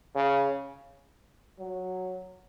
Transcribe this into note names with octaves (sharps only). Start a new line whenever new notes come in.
C#3
F#3